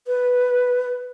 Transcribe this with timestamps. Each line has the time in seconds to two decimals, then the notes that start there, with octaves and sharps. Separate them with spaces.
0.07 B4